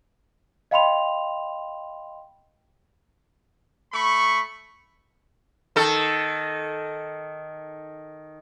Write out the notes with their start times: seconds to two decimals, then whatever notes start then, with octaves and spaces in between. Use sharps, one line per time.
0.71 D#5 F5 G5 B5 C6 F7
3.93 A3 B5 C#6
5.76 D#3 A4